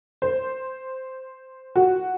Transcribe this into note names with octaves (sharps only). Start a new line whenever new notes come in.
C5
F#4